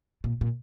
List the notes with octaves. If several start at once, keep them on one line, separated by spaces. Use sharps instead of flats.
A#2
A#2